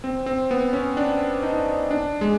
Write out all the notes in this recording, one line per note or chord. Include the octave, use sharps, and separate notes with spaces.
C4
C4
B3
C#4
D4
D#4
D4
G#3